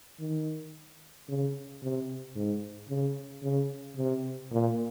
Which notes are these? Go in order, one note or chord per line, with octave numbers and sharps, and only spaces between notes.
D#3
C#3
C3
G#2
C#3
C#3
C3
A#2